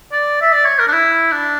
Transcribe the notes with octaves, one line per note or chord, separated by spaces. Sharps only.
D5
E5
D5
C#5
A#4
D4
E4
D4